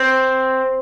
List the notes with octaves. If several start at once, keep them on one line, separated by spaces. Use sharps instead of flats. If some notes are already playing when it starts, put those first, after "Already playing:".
Already playing: C4